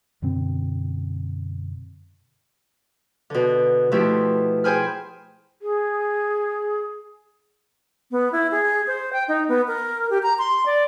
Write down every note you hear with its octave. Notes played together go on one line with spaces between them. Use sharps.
F#2 B2 D3 C4
B2 D3
B2 F3 A3 E4 G4
G#4 C5 G5 G#5 B5 F6
G#4
B3
E4
G#4
C5
G5
D#4
B3
A#4
G4
A#5
C6
D5